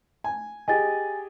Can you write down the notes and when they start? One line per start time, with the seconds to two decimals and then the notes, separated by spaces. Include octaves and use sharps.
0.24 G#5
0.68 G4 G#4 D#5 G#5 A6